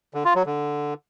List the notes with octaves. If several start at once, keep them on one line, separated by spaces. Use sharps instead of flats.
D3
F4
F#3
D3